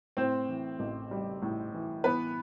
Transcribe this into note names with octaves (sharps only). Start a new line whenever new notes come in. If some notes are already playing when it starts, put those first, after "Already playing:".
A2 C4 C5
E3
A1
G3
A2
E3
E3 B3 B4